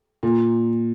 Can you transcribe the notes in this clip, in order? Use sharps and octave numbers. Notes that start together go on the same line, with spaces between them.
A#2